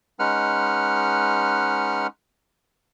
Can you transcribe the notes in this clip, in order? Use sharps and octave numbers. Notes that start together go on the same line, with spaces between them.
G#3 C#4 D#4 B4 F#5 F6